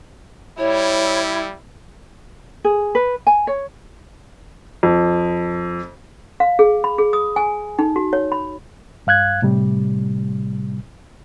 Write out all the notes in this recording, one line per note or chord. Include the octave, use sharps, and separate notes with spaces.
G3 E4 C#5
G#4
B4
G#5
C#5
F2
F5
G#4
B5
G#4
D#6
G#5
D#4
F#4
C#5
B5
G2 F5 F#6 G#6
A2 C3 G3